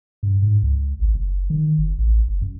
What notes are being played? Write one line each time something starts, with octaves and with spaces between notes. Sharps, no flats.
G2
G#2
C#2
G#1
F#1
D#3
F#1
A1
F#1
F#2